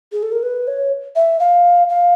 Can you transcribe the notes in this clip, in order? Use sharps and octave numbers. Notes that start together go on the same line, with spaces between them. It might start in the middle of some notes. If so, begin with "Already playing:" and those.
G#4
A4
A#4
B4
C#5
E5
F5
F5